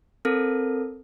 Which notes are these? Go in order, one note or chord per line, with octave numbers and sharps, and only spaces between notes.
C4 A4 A#4